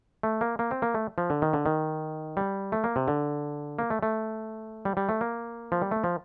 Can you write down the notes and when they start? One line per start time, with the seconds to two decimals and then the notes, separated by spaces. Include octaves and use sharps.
0.23 A3
0.41 A#3
0.59 A#3
0.71 C4
0.82 A#3
0.94 A3
1.18 F3
1.30 D3
1.42 D#3
1.53 D3
1.66 D#3
2.37 G3
2.72 A3
2.84 A#3
2.96 C3
3.08 D3
3.79 A#3
3.90 A3
4.03 A3
4.85 G3
4.97 G3
5.09 A3
5.21 A#3
5.72 F3
5.82 G3
5.91 A3
6.04 F3